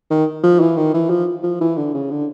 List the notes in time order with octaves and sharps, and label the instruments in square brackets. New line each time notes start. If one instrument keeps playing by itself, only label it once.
[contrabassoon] D#3
F3
E3
D#3
E3
F3
F3
E3
D3
C#3
D3